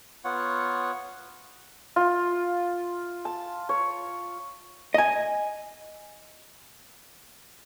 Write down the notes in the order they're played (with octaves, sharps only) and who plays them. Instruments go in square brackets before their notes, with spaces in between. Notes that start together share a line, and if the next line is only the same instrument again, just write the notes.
[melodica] B3 F4 C#5 F#5
[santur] F4
A5
C#5
[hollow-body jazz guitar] D#5 G#5